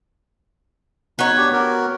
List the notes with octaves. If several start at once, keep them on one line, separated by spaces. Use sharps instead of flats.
B3 D#4 F#4 C#5
D4 G4
F#4 A#4